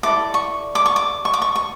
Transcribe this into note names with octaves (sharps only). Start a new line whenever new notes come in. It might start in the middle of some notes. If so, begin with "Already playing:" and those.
E4 A4 D5 D6
C#6
D6
C#6
D6
C#6
D6
C#6
C#6